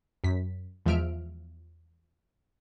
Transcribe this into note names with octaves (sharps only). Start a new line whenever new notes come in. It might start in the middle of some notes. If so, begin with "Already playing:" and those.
F#2 B6
E2 F3 G#3 E5 F6 D7